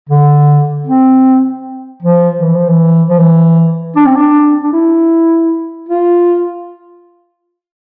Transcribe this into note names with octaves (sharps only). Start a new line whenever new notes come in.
D3
C4
F3
E3
F3
E3
F3
E3
D4
C4
D4
D4
E4
F4